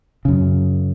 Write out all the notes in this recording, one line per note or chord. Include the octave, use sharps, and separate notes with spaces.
F#2 C#3